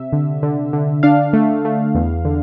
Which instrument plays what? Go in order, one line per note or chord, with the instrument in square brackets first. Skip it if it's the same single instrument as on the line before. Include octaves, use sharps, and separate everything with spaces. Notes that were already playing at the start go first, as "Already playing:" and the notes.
Already playing: [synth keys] C3 E5
D3
D3
D3
D4 F5
A3
A3
E2
D3